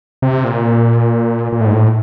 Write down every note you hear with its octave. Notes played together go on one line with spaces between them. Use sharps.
C3
A#2
A#2
A2
G#2
A2